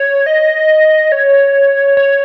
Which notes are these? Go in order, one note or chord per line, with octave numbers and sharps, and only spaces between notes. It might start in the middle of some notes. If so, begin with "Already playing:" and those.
Already playing: C#5
D#5
C#5
C#5